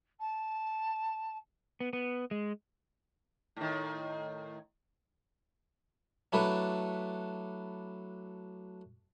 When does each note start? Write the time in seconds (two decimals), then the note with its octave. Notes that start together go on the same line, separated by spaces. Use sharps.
0.20 A5
1.80 B3
1.93 B3
2.31 G#3
3.56 A2 D#3
6.32 F#3 A3 D4 E4 A4 B4